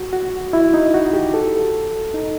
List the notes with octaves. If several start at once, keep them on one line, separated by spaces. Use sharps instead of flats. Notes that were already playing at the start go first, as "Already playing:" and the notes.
Already playing: F#4
F#4
E4
D#4
F#4
G4
A4
D#4